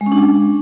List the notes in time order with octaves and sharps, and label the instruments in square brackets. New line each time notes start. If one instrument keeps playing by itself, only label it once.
[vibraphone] G#3
C#4
D4